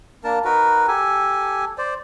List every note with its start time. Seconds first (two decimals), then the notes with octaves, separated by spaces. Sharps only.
0.24 A#3 D4 A#4 A5
0.44 D#4 F#4 A#4 B4
0.88 G4 A4 G#5
1.78 C5 D5